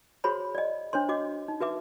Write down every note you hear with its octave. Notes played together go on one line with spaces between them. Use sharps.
F#4 G#4 C5 C#5 B5 C6
D5 D#5
D4 C5 C#5 C6
F#4 D#5 D6
D#4
F#4 B4 E5 D6